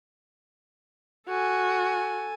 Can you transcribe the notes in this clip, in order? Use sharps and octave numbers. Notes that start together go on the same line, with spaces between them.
F#4 A4 G#5